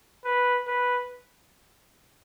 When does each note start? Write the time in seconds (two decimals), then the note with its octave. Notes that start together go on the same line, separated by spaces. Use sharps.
0.25 B4
0.67 B4